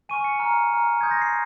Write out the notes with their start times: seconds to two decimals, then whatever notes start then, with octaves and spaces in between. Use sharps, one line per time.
0.09 G#5 C#6 F6 D#7
0.24 C#7
0.39 A#5 F6
0.71 A#5 F6
1.01 C6 D#6 G6 G#6
1.11 A#6
1.21 C7